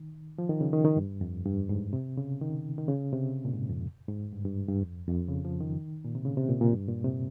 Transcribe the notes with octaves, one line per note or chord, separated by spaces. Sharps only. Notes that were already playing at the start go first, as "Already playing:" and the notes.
Already playing: D#3
F3
D#3
C#3
D#3
D#3
G2
F2
G2
G#2
C3
C#3
D#3
D#3
C#3
C3
A#2
G#2
F2
G#2
G2
G2
G2
F2
F2
C#3
F3
D#3
A#2
C3
C#3
C3
A#2
A#2
G2
A#2
C3